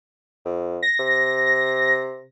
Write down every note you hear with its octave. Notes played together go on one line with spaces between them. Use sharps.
F2
A#6
C3